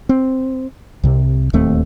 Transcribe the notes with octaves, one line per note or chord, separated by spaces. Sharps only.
C4
C2 C3
D1 D#2 A3 C4